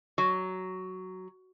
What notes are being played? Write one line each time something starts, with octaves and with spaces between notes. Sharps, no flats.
F#3